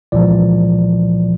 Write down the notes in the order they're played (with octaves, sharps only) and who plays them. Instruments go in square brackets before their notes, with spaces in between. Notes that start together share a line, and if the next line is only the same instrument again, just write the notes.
[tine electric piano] C#2 A#2 E3 F3 D5